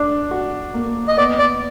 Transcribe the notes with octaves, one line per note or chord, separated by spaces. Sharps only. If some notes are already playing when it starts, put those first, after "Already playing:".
Already playing: D4
F#4
A#3
D#5
B3 D5
D5